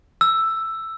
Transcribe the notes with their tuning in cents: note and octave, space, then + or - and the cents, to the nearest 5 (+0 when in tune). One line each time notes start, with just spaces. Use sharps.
E6 +5